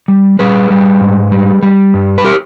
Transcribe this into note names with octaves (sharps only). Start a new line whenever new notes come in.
G3
G3 G#4 B4
G3
G#2
G3
G3
G2
B4
G4 A#4